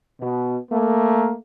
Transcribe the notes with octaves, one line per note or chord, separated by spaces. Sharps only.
B2
A3 A#3